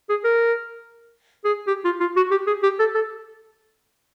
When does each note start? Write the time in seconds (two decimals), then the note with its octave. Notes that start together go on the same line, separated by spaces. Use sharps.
0.09 G#4
0.24 A#4
1.45 G#4
1.68 G4
1.85 F4
2.00 F4
2.16 F#4
2.31 G4
2.47 G#4
2.63 G4
2.79 A4
2.95 A4